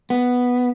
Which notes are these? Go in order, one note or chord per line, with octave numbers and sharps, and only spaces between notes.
B3